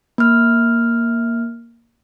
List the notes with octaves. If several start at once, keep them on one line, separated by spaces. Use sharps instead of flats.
A#3 F6